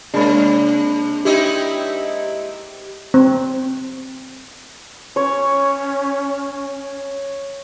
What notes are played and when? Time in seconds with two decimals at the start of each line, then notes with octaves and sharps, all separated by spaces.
0.14 C3 G#3 A#3 D4 B5
1.25 C4 D#4 E4 G4
3.14 C4
5.16 C#4 C#5